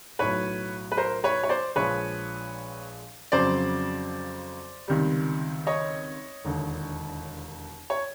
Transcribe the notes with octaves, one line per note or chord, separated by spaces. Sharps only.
B1 A2 F#3 B4 C#5
B4
A#4 C5
B4 C#5
C#5
C5 D5
A#1 A#2 F3 G#3 B4 C#5
F2 C#3 F#3 C5 D5
C#2 C3 D#3 G3
C#5 D#5
E1 D#2 D3
C#5